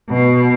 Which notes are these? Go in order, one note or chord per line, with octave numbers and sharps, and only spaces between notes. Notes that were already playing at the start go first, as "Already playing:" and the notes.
B2